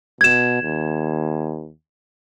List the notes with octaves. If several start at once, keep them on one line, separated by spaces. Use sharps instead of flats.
B2 G#6 E7
D#2